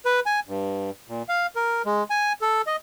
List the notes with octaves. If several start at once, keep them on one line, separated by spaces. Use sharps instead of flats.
B4
G#5
G2
A#2
F5
A#4
G#3
G#5
A4
D#5